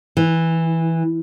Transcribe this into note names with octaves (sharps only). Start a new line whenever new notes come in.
E3